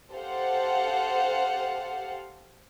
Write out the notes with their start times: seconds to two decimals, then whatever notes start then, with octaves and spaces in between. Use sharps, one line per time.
0.12 G4 A4 C5 F5 F#5